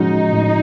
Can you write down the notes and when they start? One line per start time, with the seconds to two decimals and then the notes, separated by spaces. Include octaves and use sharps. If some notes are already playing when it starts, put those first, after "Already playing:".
Already playing: A2 F3 G#3 C#4 D#4 F#4
0.33 A2